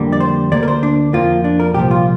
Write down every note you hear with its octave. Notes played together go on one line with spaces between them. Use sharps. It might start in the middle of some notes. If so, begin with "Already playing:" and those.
Already playing: F2 D3 G3 A#3
D5
C5
D2 D3 A#3 D5
A#4
C5
D4
F2 F3 A#3 F4
D4
A#4
C2 A#2 F3 G4
F4